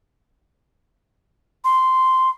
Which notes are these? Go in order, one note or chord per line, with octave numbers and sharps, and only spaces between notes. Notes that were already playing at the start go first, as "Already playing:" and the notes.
C6